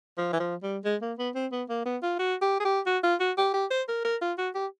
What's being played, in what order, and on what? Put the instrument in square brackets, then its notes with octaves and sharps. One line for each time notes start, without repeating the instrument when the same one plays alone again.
[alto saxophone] F3
E3
F3
G3
G#3
A#3
B3
C4
B3
A#3
B3
F4
F#4
G4
G#4
G4
F#4
F4
F#4
G4
G4
C5
A#4
A#4
F4
F#4
G4